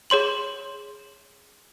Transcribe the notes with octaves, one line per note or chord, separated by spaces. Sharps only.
G#4 C#5 C6 F#7